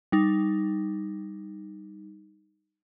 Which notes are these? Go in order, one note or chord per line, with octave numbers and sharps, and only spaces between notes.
G3 D#4